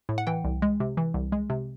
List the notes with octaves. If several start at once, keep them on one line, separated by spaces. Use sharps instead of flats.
A2
F#5
E3 G5
C2
G#3
C3
E3
C2
G#3
C3